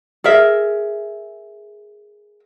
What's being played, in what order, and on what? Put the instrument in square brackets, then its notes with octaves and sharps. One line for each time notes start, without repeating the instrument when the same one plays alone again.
[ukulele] G#4 A#4 E5